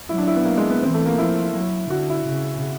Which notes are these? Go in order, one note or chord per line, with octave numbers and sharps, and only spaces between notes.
F#3 E4
D4
E4
B3
A#3
G#3
B3
E3 C4
A3
A#3
F3 E4
F#3
D3 F#4
E4
C#3